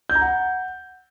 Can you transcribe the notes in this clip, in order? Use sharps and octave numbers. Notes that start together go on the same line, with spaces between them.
G6
A#5
F#5